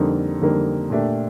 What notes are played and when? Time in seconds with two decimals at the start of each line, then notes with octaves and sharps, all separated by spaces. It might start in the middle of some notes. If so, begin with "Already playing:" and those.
Already playing: F2 D3 G3 A#3 D#4
0.41 F2 D3 G3 A#3 D#4
0.90 A#2 A3 D4 G4